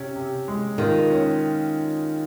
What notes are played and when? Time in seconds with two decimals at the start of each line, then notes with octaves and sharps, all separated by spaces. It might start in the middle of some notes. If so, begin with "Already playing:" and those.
Already playing: C3 C#4
0.16 C3
0.48 G#3
0.78 D#3 F4
1.10 C#4